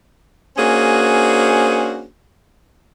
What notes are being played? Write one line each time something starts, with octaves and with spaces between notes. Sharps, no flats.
A#3 C#4 D4 F#4 G#4 C5